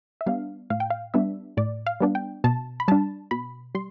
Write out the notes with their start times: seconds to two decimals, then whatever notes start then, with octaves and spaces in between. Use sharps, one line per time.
0.21 E5
0.26 G3 B3 D4 F5
0.70 A2 F5
0.80 G5
0.90 F5
1.14 G3 B3 D4 E5
1.57 A2 D5
1.86 F5
2.01 G3 B3 D4
2.15 G5
2.44 B2 A5
2.80 B5
2.88 G3 D4 A5
3.31 B2 B5
3.75 G3 C6